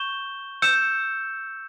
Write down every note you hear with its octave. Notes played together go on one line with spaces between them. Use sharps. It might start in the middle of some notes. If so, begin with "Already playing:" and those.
Already playing: C#6 G6 E7 G7
E6 G6 C#7 E7